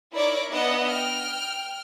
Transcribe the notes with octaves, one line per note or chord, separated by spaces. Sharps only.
D#4 E4 A#4 C#5 D5 D6
B3 D4 D#5 E5 F#5
G5 F6